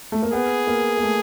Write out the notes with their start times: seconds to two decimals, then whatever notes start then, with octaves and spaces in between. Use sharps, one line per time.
0.12 A3
0.23 A#3
0.33 B3 G#4
0.67 A#3
0.98 A#3
1.02 A3